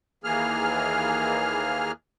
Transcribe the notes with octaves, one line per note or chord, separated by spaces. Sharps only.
D#2 E3 A#3 G#4 F6